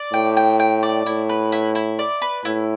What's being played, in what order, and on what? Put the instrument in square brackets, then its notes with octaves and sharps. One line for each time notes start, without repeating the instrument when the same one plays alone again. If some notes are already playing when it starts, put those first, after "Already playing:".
Already playing: [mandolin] D5
[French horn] A2 [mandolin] G5
[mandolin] G5
G5
D5
[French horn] A2 [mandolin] E4
[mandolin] B4
E4
E4
D5
B4
[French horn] A2 [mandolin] E4